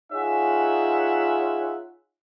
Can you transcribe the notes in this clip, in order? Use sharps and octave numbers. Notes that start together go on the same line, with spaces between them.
D#4 F4 G#4 C#5 E5 F#5